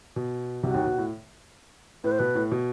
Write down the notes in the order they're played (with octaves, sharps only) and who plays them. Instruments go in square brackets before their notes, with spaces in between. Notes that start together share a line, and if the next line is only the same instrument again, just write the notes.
[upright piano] B2
[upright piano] C2 C3 [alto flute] F#4
[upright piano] D#2 D#3
B2
A2
[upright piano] A2 [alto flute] B4
[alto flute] C5
[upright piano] B2 [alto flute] B4
[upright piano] A2
B2